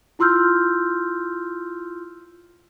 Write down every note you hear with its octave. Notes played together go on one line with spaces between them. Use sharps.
E4 F4 C6 E6 F6 G6